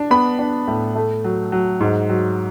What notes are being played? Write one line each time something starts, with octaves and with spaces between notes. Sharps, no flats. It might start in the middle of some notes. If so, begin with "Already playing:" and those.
Already playing: D4
B3 B5
D4
A2
A3
F#3
F#3
G#2
F#3